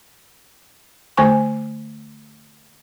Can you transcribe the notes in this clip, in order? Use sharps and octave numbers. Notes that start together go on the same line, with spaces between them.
D3 A3 C5 G#5 C#6